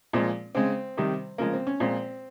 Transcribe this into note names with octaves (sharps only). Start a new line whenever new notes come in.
A#2 F3 G#3
C#3 G#3 C4
C3 D#3 G3
C#3 F3 G#3 A#3
C4
C#4
A#2 F3 G#3 C4